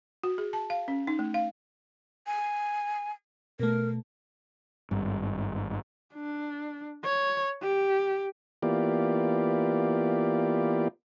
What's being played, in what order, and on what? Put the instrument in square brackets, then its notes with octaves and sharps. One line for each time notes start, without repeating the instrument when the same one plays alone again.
[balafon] F#4
G#4
A5
F5
C#4
D#4
A3
F5
[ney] G#5
[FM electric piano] B2 A3 [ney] A#4
[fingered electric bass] G#1 G2
[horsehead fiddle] D4
C#5
G4
[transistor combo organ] E3 A#3 B3 F4 G4 D5